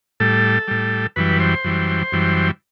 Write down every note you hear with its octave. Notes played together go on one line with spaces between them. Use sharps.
A2 G3 A4
A2 G3
F#2 E3 G3 B4
C5
F#2 E3 G3
F#2 E3 G3